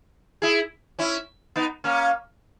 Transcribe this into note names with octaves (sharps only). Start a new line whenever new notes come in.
E4 G#4
C#4 E4
B3 D#4
A#3 C#4